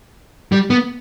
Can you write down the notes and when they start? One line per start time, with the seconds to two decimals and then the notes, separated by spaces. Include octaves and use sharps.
0.52 G3
0.70 B3